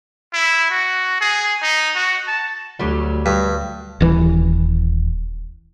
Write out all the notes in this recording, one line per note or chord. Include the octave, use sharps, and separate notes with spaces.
E4
F#4
G#4
D#4
F#4
A5
D2 F#3 G3
G2
D#1 E3